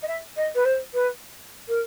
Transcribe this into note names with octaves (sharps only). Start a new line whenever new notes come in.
D#5
E5
D#5
B4
C5
B4
A#4